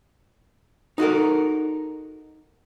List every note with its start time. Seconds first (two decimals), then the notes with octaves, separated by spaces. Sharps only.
0.98 D#4 F#4 A4 A#4